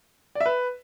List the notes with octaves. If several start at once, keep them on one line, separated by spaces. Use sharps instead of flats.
D5
E5
B4